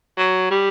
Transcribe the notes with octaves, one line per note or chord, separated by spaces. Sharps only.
F#3
G3